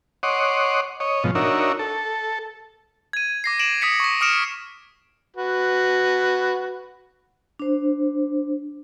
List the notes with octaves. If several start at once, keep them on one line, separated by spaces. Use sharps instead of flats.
C#5 D#5 F#5 C6 D6
C#5 D#5
G#2 B2 F3
D4 D#4 F#4 A#4 C#5 E5
A4
G#6 D#7
D6 A#6 C7
D7 E7 F#7
D#6 G#6 B6 C#7
C#6 A#6
D6 D#6 F6 C#7 D7 E7
F#4 B4
D4 C5